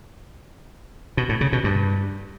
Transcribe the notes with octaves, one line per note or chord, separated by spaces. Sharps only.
B2
A2
C#3
B2
G2